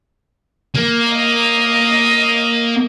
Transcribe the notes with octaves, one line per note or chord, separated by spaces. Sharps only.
A#3
D#5